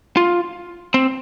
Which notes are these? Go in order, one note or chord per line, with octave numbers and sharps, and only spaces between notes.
F4
C4